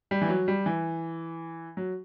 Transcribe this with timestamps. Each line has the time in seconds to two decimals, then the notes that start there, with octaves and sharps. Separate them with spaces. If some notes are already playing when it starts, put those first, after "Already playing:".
0.11 G3
0.22 E3
0.29 F#3
0.48 G3
0.66 E3
1.77 F#3